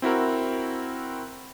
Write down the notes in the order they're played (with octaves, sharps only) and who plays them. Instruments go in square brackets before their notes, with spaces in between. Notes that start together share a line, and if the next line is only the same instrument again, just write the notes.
[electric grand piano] C4 E4 F#4 A#4